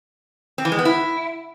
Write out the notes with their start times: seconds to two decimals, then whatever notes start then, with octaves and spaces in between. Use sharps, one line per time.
0.58 C4
0.65 E3
0.72 G#3
0.79 B3
0.85 E4